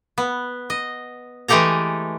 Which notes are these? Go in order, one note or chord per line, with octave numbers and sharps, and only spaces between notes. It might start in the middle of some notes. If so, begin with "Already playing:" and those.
B3
D#5
E3 G#3 A3 G4 A4 A#5